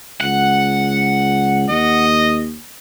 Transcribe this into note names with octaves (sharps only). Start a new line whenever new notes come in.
C#2 F#5
D#2 D#5